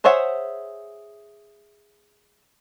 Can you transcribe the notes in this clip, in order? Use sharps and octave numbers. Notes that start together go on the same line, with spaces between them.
G#4 C5 C#5 E5 F#5